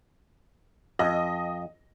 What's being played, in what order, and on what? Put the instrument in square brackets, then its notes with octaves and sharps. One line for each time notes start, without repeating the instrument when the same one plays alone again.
[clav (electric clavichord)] F2 [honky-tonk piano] D#5